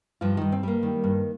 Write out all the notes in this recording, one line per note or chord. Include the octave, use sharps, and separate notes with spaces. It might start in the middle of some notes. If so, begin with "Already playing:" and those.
G2 F3 F4
G2 D#3 D#4
C4
G3 A#3
D#3
G2